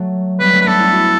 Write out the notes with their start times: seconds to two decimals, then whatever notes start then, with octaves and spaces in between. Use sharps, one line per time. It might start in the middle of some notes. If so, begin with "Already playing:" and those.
Already playing: F#3 A3
0.40 G3 B3 B4
0.53 A3 C#4
0.61 B4
0.67 B3 D4 A4
0.79 C#4 E4
0.93 D4 F#4